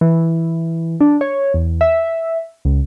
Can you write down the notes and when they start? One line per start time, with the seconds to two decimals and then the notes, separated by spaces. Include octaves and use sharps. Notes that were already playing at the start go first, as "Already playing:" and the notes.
0.01 E3
1.01 D4
1.21 C#5
1.54 E2
1.81 E5
2.65 C#2